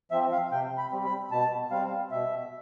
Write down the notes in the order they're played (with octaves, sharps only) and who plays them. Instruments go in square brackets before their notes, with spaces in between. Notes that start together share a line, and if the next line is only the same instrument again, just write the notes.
[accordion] F3 C4 E5
F5
C3 G5
B5
G3 C4
B5
B2 A5
G3 C4 F5
B2 E5